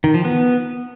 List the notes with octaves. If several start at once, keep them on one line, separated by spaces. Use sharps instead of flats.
D#3
F3
B3